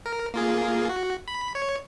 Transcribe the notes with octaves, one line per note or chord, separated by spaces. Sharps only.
A#4
A#3 F4 G#4
F#4
B5
C#5